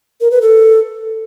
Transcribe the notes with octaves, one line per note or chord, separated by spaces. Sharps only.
A#4
B4
A4